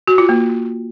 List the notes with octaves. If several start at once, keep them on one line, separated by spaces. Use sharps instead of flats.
F#4
F4
A#3